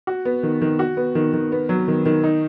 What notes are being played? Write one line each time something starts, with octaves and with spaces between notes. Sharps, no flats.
F#4
B3
D#3
D#3
F#4
B3
D#3
D#3
B3
F#3
D#3
D#3
D#4